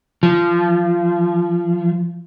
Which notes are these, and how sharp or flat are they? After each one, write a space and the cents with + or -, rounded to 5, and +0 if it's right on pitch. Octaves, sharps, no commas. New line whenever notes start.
F3 -20